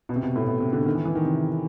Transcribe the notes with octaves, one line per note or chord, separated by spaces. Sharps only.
B2
C3
B2
A2
B2
C3
D3
D#3
E3
E3
D#3
C3